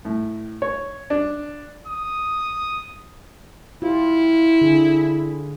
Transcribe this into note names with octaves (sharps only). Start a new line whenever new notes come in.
A2
C#5
D4
D#6
E4 F4 G4
D3 G#4